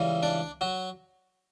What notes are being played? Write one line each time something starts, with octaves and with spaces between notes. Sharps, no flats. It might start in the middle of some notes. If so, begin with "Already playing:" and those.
Already playing: C#2 C#3 E3 G3
D4 D5
F#3 F#4